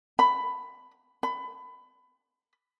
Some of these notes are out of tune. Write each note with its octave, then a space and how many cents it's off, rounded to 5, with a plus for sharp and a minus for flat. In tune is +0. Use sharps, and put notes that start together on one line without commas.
B5 +10
B5 +25